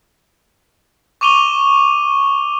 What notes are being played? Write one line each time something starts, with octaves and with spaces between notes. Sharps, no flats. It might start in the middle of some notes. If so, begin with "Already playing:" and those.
C#6 D6 D#7 F7 G7